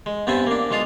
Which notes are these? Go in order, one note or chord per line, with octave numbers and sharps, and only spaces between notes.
G#3
G2 B3 C4 E5 G#5 A5
A#3 D4
B1 G#3 F4 F5 A5 D#6